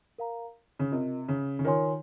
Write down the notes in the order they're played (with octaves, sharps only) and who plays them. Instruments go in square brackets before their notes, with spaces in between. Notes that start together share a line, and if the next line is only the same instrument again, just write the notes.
[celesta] A#4 F5 A#5
[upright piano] C#3
[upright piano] C3 [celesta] F4 A#4 D#5
[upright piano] C#3
C#3
[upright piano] D#3 [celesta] F4 A#4 C#5 G#5 C6